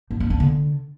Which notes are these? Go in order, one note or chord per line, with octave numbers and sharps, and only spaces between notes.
F3
C#4
D4
D3